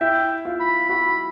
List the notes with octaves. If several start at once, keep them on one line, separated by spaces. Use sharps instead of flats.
E4 E5 G5
F4 F5
B5
F#4 F#5 B5